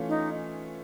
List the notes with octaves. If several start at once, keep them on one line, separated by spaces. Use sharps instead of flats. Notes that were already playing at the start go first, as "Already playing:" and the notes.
Already playing: E3 A3 C#4 F4
D#4